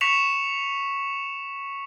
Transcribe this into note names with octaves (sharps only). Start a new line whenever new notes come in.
C#6 B6 C#7 E7 F7